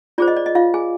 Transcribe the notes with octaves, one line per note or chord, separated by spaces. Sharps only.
F4 G#4 C5 D5
D#5
D5
D#5
F4 F5
G#4 G#5